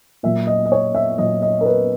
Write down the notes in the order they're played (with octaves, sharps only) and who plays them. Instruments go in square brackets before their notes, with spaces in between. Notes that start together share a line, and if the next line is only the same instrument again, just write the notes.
[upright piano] A#2 F#3 E5
D#5
D#5
C#5
E5
A#2 F#3 D#5
D#5
A#4
B4